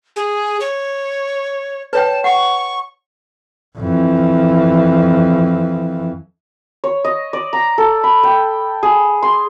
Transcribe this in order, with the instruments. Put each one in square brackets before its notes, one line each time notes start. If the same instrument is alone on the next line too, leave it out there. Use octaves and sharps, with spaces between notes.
[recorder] G#4
C#5
[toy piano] B4 C#5 G5 [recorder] A5
[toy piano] F#5 [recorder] C#6
[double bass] F2 E3
[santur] C#5
D#5
D5
A#5
A4
B5
G5
G#4
C6